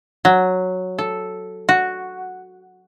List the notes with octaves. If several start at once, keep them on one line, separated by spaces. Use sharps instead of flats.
F#3
A4
F#4